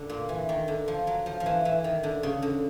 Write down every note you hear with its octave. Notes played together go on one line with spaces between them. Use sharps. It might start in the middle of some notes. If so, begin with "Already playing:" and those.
Already playing: D3
A#2
E3
D#3
D3
F3
F#3
F3
F3
E3
E3
D#3
D3
C#3
D3